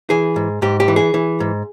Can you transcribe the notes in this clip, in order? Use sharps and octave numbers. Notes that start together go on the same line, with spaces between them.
E3 G#4
G#2
G#2 G4
G4
E3
G#4
E3
G#2